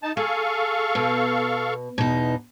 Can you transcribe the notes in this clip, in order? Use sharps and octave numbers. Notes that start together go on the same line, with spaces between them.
D#4 A5
G#4 A4 F5 C#6
B2
E2 B2 D#4